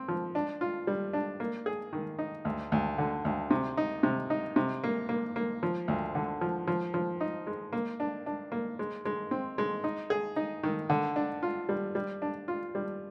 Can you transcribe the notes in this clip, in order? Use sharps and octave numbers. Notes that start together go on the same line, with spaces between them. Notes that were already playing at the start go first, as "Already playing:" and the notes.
Already playing: C4
F3
D4
F4
G3
D4
A#3
G#4
D#3
D#4
D2
D2
D3
D2
C3
D#4
C3
D#4
C3
A#3
A#3
A#3
F3
D2
D3
F3
F3
F3
D#4
G#3
A#3
D4
D4
A#3
G#3
G#3
C4
G#3
D#4
G#4
D#4
D#3
D3
D4
F4
G3
G3
D4
F4
G3